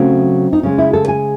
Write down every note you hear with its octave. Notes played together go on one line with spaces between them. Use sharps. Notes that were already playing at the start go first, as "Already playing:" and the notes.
Already playing: C#3 F#3 A3 C4
D#4
C#3 G#3 C#4
E4
A4
G#5